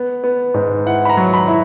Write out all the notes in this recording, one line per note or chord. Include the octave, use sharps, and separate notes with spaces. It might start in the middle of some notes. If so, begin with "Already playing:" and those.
Already playing: B3
B3
G#2
E4 F#5
B5
A#5
F#3
B5
E4